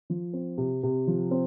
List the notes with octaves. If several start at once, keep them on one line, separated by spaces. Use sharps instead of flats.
F3
C4
C3
C3
F3
C4